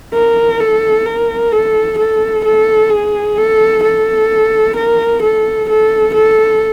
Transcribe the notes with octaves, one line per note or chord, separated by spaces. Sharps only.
A#4
A4
A#4
A4
A4
A4
G#4
A4
A4
A#4
A4
A4
A4